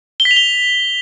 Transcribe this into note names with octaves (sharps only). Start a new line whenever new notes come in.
G7
B6
F7
G7